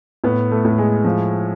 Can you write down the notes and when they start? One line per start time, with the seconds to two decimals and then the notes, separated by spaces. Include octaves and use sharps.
0.24 A2 B3
0.51 A3
0.65 A2
0.78 G#3
1.05 F3